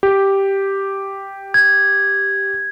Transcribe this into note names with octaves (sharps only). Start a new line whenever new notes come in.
G4
G#6